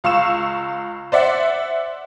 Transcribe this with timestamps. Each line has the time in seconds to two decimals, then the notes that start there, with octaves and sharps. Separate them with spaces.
0.04 C#2 F5 C#6 E6 E7
1.12 C5 D5 E5 F#5